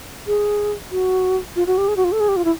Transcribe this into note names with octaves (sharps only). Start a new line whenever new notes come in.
G#4
F#4
F4
F#4
G4
G#4
F#4
F4
A4
G#4
G4
F4
E4